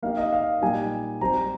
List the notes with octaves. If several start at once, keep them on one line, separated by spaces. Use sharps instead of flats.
A#3 D#4 G4 A#4 F5
D#5
F5
A#2 G3 A#3 D#4 G4 G#5
G3 C4 G4 C5 A#5